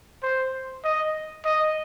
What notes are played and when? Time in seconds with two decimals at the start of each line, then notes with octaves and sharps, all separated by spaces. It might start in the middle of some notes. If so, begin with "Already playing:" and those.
0.23 C5
0.84 D#5
1.45 D#5